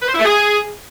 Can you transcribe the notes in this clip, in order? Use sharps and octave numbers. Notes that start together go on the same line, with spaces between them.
B4
C5
E4
A3
G#4